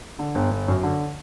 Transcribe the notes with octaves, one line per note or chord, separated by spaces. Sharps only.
D3
G1
G1
F#2
D3